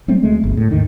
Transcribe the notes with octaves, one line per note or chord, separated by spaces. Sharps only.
F#3 G3 A3 C4
D2 G#3 A3
G1 D2
A2
D#2 G#2 D3 D#3